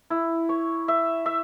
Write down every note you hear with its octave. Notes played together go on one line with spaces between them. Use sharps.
E4
C#5
E5
E5